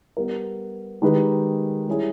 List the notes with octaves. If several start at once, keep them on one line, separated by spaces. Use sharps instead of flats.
G3 B3 G4 A#4
D#3 G#3 D#4 G4 B4
G3 C#4 E4 G#4